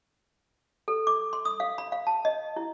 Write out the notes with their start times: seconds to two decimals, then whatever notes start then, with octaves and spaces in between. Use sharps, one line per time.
0.88 A4
1.07 D6
1.33 C6
1.45 D#6
1.60 F5
1.78 B5
1.92 F5
2.07 A5
2.25 D#5
2.56 E4